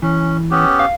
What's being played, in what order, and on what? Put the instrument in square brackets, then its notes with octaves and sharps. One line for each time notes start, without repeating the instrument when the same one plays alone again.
[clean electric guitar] E3 [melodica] C#4
[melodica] B3 C#4 G4
[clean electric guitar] F5